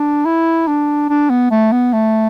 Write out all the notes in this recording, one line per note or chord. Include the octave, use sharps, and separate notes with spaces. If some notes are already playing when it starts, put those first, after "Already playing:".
Already playing: D4
E4
D4
D4
B3
A3
B3
A3